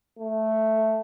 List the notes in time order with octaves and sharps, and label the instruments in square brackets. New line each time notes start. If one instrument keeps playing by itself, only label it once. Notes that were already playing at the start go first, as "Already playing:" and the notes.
[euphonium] A3